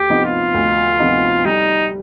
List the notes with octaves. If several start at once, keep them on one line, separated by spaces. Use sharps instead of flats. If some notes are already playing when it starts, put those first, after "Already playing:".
Already playing: D2 G4
C3 F3 B3 D#4
F4
D2
C3 F3 B3 D#4
G3 D#4